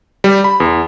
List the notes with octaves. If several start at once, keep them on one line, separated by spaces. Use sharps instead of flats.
G3
B5
E2